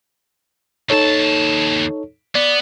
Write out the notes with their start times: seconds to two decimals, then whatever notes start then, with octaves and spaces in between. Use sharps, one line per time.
0.90 D#2 D#4 A4 C#5 A5
2.35 B3 D5